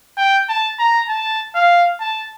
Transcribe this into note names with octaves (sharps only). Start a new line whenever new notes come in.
G5
A5
A#5
A5
F5
A5